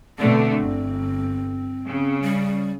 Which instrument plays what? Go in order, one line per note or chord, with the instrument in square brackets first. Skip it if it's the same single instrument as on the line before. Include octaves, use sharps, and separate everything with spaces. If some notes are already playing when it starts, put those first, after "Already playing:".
[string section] B2 D3 A3 [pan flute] C4
[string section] G1
C#3
[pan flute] G3